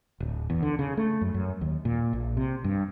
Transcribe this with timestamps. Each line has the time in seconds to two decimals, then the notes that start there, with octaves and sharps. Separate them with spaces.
0.20 D1
0.50 E2
0.63 D3
0.79 C#3
0.97 A3
1.21 F#2
1.34 F#2
1.61 D#2
1.85 A#2
2.13 A#1
2.37 C3
2.64 G2